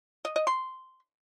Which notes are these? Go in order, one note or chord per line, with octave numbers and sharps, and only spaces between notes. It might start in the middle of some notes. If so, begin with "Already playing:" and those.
D#5
D#5
C6